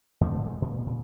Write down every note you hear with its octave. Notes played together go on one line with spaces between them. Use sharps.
G#2 D3 A3 C4
G#3
A#2
A#2